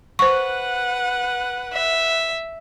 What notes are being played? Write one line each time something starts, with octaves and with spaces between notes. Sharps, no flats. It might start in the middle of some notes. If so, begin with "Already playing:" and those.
B4 C5 F#5 C#6
E5